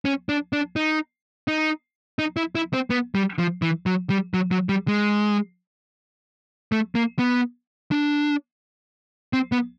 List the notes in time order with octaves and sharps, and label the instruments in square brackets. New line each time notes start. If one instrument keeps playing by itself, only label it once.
[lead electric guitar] C#4
D4
D4
D#4
D#4
D#4
E4
E4
C4
B3
G3
F3
E3
F#3
G3
F#3
F#3
G3
G#3
A3
A#3
B3
D4
C4
B3